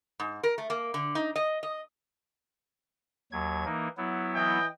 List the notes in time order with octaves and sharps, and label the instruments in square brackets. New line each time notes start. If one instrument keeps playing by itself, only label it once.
[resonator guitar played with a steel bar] G#2
A#4
A3
A#3
D3
D#4
D#5
D#5
[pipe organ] D#2 F#3 G#6
E3 A#3 D#4
F#3 B3 E4
[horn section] E3 D#5 G5